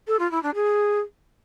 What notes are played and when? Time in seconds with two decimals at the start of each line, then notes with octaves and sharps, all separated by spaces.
0.07 A4
0.19 F4
0.31 E4
0.43 D4
0.55 G#4